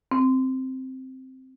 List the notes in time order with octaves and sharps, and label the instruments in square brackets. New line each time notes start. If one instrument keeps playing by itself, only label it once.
[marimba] C4